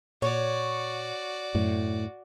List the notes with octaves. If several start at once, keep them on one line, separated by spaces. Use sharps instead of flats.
A#2 F#4 C#5 D5
F#2 A2